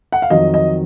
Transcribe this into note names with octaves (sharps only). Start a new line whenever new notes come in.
F#5
F5
F2 D#3 F#3 D#5
D#5